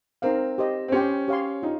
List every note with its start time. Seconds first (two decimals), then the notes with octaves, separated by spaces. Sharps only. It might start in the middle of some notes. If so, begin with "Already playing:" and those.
0.22 C4 D#4 A#4 F5
0.58 G4 C5 D#5
0.88 C4
0.92 C#4 G4 C5 G5
1.28 G4 C#5 F5 C6
1.63 D#4 F4